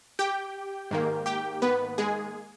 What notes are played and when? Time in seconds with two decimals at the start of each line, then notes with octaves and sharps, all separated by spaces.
0.19 G4 G5
0.91 G#2 D#3 A#3
1.26 G4 G5
1.62 B3 B4
1.98 G#3 G#4